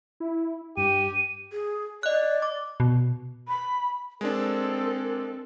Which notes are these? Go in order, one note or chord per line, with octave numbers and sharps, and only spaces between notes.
E4
G2 G4 D#7
G#4
D5 D#5 F#6
D6
B2
B5
G#3 C4 D4 A4 A#4